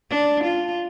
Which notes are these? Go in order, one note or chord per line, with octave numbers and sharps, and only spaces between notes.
D4
F4